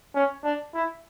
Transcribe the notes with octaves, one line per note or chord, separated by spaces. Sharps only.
C#4
D4
E4